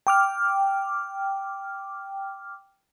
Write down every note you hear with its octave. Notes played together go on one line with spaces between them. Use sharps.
G5 D6 F6